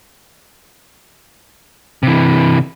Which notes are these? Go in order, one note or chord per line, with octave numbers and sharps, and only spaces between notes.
C3 E3